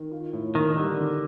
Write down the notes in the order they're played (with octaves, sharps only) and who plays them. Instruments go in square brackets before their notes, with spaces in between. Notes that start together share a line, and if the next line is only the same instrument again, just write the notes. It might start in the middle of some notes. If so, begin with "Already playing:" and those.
Already playing: [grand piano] D#3
F4
A2
[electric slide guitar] D#3 [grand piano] A#3
[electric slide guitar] D3 [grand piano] G3
[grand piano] D#3